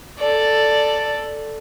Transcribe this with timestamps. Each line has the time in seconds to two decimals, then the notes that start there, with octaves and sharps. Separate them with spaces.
0.19 A4 D5